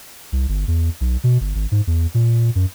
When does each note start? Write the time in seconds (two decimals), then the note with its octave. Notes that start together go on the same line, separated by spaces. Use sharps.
0.32 C2
0.49 G1
0.68 E2
1.01 B1
1.24 B2
1.41 G1
1.55 G#1
1.72 G#2
1.87 E2
2.14 A#2
2.55 F#2